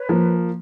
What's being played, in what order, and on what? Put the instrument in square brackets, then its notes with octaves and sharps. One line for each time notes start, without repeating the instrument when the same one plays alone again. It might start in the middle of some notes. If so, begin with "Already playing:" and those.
Already playing: [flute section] B4 C#5
[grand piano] F3 A#3